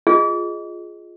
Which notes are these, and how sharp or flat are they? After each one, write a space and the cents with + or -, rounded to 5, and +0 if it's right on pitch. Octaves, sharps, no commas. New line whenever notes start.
F4 +0 G#4 +0 D#5 +0